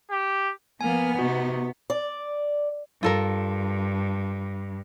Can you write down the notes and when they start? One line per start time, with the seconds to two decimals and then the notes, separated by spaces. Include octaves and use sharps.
0.11 G4
0.81 F3 A#3 B3 G#5 F6
1.19 C3 D#4 F#4
1.90 D5
3.03 G2 F4 A4 A#4